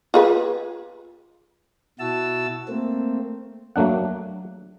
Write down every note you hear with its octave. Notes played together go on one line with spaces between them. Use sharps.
F4 G#4 B4
B2 E4 F#4 A5 E6
A3 A#3 C4
F#3 A3 A#3 D4 F#5